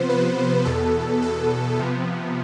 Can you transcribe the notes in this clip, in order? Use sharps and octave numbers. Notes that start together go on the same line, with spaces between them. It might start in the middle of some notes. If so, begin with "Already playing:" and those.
Already playing: C3 F3 B3 C5
B4
E2 B2 B3 A4
A4
C3 F3 B3